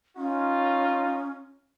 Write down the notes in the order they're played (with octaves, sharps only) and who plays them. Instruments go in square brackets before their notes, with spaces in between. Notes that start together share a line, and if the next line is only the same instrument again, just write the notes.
[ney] C#4 [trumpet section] D#4 F4